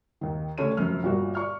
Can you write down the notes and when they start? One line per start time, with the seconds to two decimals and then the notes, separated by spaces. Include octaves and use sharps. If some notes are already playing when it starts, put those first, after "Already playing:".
0.21 D#2 D#3
0.58 D3 A3 C#4 C#5 D#7
0.77 F1 F#2 F6
1.03 G1 A#2 G3 F#4
1.35 D5 C#6 F6